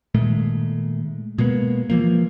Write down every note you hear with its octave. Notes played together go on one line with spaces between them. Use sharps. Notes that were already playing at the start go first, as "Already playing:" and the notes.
A#2 D#3 G#3 A3
B2 G#3 A#3 B3
E3 F3 A#3